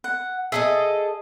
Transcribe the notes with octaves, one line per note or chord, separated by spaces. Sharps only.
F#5
G#4 A4 D#5 E5